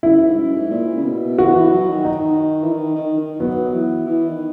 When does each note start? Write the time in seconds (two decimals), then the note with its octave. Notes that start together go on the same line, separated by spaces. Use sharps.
0.03 F#2 E4
0.20 G#2
0.37 F#2
0.55 G#2
0.70 A#2
0.96 C#3
1.05 B2
1.38 E3 F#4
1.55 E3
1.72 F#3
1.89 D#3
2.05 D#4
2.63 E3
2.73 D#3
2.95 D#3
3.18 D#3
3.40 F#3 B3
3.73 E3
4.06 E3
4.29 D#3